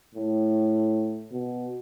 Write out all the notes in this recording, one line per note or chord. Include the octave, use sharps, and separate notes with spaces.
A2
B2